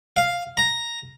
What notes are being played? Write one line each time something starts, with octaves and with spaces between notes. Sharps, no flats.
F5
A#5